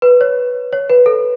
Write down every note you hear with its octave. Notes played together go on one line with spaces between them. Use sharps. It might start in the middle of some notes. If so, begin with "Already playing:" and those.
B4
C#5
C#5
B4
A4